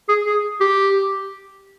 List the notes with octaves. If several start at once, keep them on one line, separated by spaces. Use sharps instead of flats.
G#4
G#4
G4